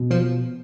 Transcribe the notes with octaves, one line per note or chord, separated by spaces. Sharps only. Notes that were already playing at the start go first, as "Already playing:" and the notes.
Already playing: B2
F3